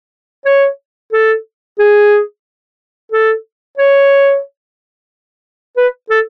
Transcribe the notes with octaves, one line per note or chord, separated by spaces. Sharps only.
C#5
A4
G#4
A4
C#5
B4
A4